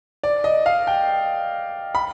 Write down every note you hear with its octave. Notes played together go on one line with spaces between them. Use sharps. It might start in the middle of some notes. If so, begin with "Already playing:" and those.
D5
D#5
F5
G5
B5